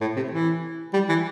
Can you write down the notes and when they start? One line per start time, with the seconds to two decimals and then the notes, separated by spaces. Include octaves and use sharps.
0.01 A2
0.16 C3
0.31 E3
0.94 G3
1.09 E3